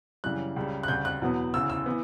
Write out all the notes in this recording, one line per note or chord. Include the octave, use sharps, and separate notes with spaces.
F#2 C#3 E3 G3 F#6
C#2 C#3 G3
F#6
D2 C#3 G3 G6
F#6
E2 B2 F#3 B3
D2 C#3 E3 E6
E6
E3 B3